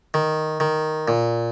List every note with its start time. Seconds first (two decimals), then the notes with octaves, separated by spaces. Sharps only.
0.14 D#3
0.60 D#3
1.08 A#2